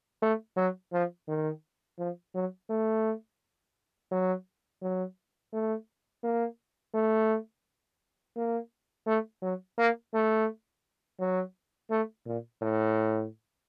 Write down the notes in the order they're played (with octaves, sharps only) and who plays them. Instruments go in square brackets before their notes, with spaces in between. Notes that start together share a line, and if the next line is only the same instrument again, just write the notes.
[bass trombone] A3
F#3
F3
D#3
F3
F#3
A3
F#3
F#3
A3
A#3
A3
A#3
A3
F#3
A#3
A3
F#3
A3
A#2
A2